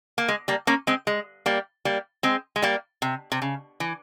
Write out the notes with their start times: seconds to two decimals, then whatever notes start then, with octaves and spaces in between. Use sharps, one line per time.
0.18 A#3
0.28 G#3
0.48 G3 A#3
0.67 A#3 C#4
0.87 G#3 C4
1.07 G#3
1.46 G3 A#3
1.85 G3 A#3
2.23 G#3 C4
2.56 G#3
2.62 G3 A#3
3.02 C3
3.32 C3
3.42 C#3
3.80 E3